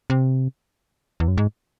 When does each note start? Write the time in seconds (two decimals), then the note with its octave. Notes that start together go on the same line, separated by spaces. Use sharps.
0.10 C3
1.20 E2
1.28 F#2
1.37 G#2